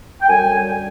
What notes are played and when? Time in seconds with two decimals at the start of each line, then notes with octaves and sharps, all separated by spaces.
0.21 G5
0.29 F#2 D3 G3 G#5